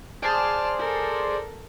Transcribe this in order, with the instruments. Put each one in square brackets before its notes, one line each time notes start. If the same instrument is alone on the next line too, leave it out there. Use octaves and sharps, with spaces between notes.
[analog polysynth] G#4 C5 D5 [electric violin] A5 F6
[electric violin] A4 A#4